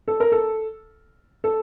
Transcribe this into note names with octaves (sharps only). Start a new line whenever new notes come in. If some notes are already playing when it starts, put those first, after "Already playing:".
A4
A#4
A4
A4